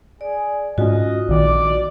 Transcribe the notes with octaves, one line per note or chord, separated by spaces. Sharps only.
G#4 D5
G#2 C#4 F4 F#4 D#5
A#1 D#3 D5